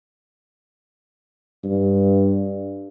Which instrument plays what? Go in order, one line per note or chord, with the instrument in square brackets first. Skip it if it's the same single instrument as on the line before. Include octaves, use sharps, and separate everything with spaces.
[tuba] G2